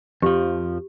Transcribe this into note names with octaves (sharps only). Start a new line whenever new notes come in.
F2 F3 G4